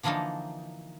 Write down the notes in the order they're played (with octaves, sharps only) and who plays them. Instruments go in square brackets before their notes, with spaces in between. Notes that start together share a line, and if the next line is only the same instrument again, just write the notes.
[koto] D3 E3 F3 A#3 D4 D#4